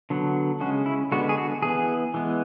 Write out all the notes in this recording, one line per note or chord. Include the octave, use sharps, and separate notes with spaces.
D3 F#3 B3
C#3 G#3 C#4 F#4
E4
D3 G#3 B3 F#4
G#4
F#4
E3 B3 G#4
E3 G#3 B3